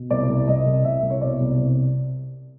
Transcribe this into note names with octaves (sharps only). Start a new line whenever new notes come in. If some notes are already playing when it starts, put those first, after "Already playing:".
Already playing: B2
C2 D5
C2
C2 D#5
C2
C2 E5
C2
C#5
B2 D5
C2
C3